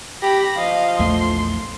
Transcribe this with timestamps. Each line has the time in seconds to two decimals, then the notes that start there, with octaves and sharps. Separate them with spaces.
0.23 G4 B5 A#6
0.58 F3 D#5 F5
0.99 A#1 E2 A3 C6